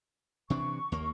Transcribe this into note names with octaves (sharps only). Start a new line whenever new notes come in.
C3 E3 D4 C#6
D#2 A#3